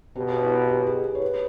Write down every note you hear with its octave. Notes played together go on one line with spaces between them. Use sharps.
B2 G4
E4
G4
G#4
B4
C#5
B4